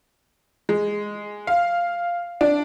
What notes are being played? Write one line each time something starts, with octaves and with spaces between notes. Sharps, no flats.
G#3
F5
D4